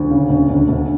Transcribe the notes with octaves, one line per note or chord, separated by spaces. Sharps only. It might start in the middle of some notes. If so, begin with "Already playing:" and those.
Already playing: D2
C#3
D2
D2
D2